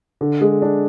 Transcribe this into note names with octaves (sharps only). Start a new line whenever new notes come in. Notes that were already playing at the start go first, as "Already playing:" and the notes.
D3
G#3
D4